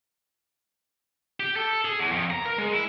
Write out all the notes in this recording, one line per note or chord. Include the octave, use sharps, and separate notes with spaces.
G4
A4
G#4
E2
F2
A#5
A#4
G#3
E4